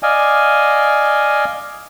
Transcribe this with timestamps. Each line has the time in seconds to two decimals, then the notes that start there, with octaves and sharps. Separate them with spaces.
0.03 D5 D#5 F5 G#5